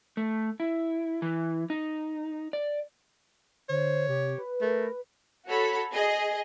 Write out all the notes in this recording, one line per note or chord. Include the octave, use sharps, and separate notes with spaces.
A3
E4
E3
D#4
D5
D3 C5 C#5
C3 G4
B4
A3 A#4
F#4 A4 C#5 B5
G#4 D#5